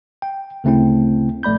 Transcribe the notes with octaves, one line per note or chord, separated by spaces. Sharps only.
G5
D2 C#3 A3 C4 E4 G5
A#1 A3 D5 B5 G6